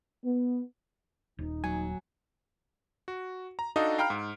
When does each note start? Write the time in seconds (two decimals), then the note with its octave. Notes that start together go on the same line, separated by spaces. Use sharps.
0.25 B3
1.39 D#1 D#4
1.64 F#3 G#5
3.08 F#4
3.59 A#5
3.76 D4 D#4 F#4 A4 D#5 F5
3.98 F5 G5 A#5 B5 F6 D7
4.10 G#2